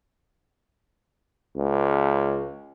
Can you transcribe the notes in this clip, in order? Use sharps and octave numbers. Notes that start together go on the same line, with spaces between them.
C#2